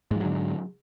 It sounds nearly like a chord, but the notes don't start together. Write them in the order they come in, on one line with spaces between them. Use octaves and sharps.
G#2 F3 F#3 D3